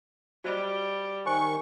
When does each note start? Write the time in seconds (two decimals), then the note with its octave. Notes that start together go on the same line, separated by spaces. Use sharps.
0.44 G3 F#4 C5 D#5
1.26 D#3 C5 G#5 C#6